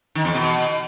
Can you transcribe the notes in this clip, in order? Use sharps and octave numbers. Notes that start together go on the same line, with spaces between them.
D#3
E2
B2